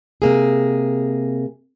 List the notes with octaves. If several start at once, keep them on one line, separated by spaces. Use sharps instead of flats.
C3 A#3 G#4